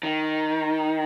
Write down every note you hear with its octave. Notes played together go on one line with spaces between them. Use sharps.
D#3